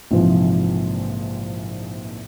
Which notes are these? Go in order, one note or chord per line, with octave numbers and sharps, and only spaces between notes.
A#1 G#2 C3 E3 F3